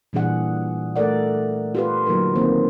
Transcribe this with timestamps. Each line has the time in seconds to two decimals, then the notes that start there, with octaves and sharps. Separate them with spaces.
0.13 A#2 E3 G3 D4 G#4 F#5
0.96 A3 A4 A#4 D5 F#5
1.75 F4 G4 B4
2.06 D3 F#3 A#3 D#4 A#4
2.35 D#3 A#3 C4 C5